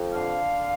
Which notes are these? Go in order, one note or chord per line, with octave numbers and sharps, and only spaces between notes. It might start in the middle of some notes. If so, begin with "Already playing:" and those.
Already playing: F2
D3 F5